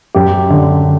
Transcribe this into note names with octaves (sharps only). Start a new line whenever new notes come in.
F#2 G4
D3